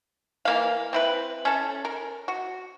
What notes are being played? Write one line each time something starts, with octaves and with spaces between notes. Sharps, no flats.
E3 A#3 F5
C4 E4 B4
C#4 A4
A#4
F#4